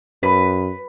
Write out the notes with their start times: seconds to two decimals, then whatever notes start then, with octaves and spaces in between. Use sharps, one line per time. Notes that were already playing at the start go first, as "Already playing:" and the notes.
0.23 F#2 B4